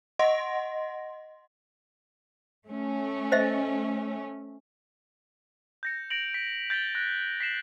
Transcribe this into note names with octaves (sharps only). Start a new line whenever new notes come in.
D#5 F#5 C6 A#6
A3 C#4
C5 D#5 E5
G6 A#6 C#7
A#6 D7 F7 F#7
B6
G6 A6 B6 F#7 G7
F#6 A#6
B6 C7 E7 F#7